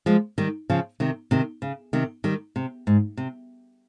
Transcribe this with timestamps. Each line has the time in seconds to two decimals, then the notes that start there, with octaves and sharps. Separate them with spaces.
0.06 F3 G#3
0.38 D#3 G3
0.70 C#3 F3
1.00 C3 D#3
1.31 C3 D#3
1.62 C#3
1.93 C3 D#3
2.24 D#3 G3
2.56 C3
2.87 G#2
3.17 C3